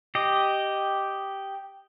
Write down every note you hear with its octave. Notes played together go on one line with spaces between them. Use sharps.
G4 D#5